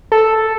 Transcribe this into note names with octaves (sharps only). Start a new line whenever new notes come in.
A4